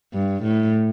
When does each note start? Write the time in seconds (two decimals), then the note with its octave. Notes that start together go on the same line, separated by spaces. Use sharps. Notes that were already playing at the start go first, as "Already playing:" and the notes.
0.14 G2
0.43 A2